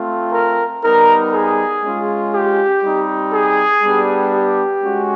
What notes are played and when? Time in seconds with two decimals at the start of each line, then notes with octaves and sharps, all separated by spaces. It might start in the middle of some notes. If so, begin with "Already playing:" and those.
Already playing: A3 C4 F4
0.33 A#4
0.83 G3 B3 D#4 A#4
1.33 G#4
1.83 G#3 C#4 F4
2.34 G4
2.84 G3 C4 D#4
3.33 G#4
3.84 G3 B3 D4 G4
4.34 G4
4.84 G#3 C#4 F#4